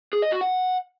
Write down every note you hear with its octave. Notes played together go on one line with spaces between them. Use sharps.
G#4
D#5
F#4
F#5